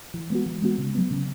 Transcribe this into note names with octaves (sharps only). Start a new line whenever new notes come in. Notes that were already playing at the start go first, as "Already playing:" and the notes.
E3
G#3 B3 F#4
E3
G#3 B3 F#4
C#3
F#3 B3
C#3